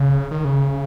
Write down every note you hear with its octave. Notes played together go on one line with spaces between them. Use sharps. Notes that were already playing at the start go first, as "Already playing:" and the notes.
Already playing: C#3
D#3
C#3